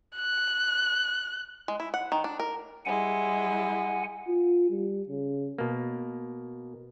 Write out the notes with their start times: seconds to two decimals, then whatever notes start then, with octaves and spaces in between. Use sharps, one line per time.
0.15 F#6
1.68 G#3
1.80 E4
1.94 F#5
2.12 D#3
2.24 D4
2.39 A#4
2.85 G3 G#3 E4 F#5 G#5
4.28 F4
4.70 G3
5.09 C#3
5.58 B2 A#3